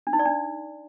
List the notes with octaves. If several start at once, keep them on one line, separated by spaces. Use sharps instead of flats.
D4
D#4
D5
D4